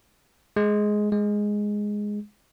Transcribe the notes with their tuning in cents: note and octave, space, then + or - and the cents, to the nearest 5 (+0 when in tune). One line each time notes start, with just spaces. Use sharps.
G#3 +10
G#3 +0